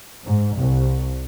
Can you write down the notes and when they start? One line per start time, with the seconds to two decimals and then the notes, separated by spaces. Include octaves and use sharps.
0.24 G#2
0.56 C2